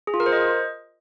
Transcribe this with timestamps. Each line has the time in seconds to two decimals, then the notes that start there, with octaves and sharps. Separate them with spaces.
0.07 G#4
0.14 F4
0.20 A#4
0.26 C5
0.32 D#5